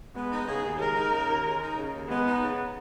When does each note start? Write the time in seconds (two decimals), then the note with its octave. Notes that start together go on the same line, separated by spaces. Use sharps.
0.15 G#3 B3
0.31 D#4
0.47 C#3 G#4
0.64 D#2
0.79 G#3 A#4
0.96 D#4
1.12 C#3
1.28 D#2
1.44 G#3
1.61 D#4
1.77 C#3
1.93 D#2
2.09 G#3 B3
2.25 D#4
2.41 C#3